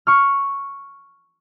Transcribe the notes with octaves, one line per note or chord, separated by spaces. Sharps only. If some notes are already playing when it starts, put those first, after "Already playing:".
C#6 F6